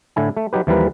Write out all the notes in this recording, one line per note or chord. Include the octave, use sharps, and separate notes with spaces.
A2 D3 E4 G#5
A3
F#3 D#4 G4 B4
D#2 E3 F3 G3 A#4 B4